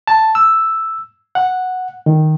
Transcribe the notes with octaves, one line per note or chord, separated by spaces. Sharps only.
A5
E6
F#5
D#3